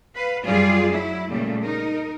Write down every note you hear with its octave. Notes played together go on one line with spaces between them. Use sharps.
B4 F5
F#2 G3 F4 G#4 D5
F#3 E4
A#2 C#3 G3 A3
D#4 A#4